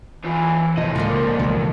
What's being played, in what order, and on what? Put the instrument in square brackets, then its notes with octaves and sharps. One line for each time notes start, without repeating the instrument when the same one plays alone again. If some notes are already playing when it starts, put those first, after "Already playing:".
[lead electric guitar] D#2 F4 [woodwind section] E3
[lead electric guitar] F2 D#5 [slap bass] A2 C3 [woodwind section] F3
[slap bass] C#2 [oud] D3 A#3 D5
[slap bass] C#2 B2 E3